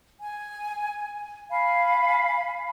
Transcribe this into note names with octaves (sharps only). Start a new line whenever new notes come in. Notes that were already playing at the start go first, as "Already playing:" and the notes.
G#5
F5 G#5 B5